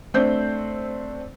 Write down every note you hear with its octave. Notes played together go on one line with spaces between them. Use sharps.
A3 C4 D4 C5 G6